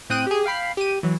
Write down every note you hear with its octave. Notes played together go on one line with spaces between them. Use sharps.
A2 C4 G5 D#6 F#6 D#7
G4 G#4
F5 G5 B5 C7
G4 D#7
E3 F#3